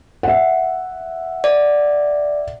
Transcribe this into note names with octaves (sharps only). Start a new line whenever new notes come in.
E5 F#5
D5